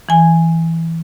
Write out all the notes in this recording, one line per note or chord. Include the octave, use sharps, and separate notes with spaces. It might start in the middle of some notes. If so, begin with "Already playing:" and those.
E3 G#5